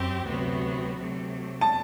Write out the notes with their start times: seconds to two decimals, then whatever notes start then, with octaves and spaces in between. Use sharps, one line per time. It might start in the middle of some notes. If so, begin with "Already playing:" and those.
Already playing: F#2 C4 G4
0.27 D2 C3 F#3 B3 F#4
0.98 C3 F#3 A3
1.61 A5